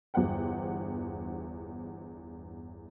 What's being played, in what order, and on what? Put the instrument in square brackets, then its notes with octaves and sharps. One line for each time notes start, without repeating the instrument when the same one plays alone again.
[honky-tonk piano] G1 E2 G2 C5 F#5 G5